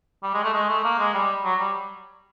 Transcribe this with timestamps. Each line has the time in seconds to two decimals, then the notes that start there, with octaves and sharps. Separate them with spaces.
0.23 G3
0.34 G#3
0.44 A3
0.54 G#3
0.69 A3
0.84 A#3
0.99 G#3
1.14 G3
1.44 F#3
1.60 G3